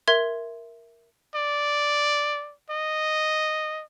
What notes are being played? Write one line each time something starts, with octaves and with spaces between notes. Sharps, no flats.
A#4 E5 C6 G#6
D5
D#5